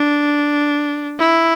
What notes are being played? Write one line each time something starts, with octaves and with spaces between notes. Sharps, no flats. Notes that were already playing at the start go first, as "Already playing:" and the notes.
Already playing: D4
E4